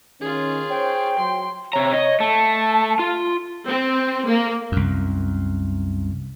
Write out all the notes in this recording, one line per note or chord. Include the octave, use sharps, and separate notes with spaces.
D#3 C#4 F4 G#4
C5 C#5 G5
F#3 C6
C3 C#5 A#5
D#5
A3 A5
F4
C4
A#3
C2 F#2